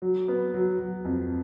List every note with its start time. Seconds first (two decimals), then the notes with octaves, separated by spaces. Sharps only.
0.02 F#3
0.28 B3
0.54 F#3
0.79 F#3
1.05 F2